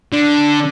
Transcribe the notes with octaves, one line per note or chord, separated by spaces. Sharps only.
D3